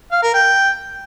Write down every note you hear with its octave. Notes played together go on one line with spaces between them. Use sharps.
F5
A#4
G5